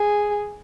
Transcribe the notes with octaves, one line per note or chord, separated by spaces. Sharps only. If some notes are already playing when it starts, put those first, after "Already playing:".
Already playing: G#4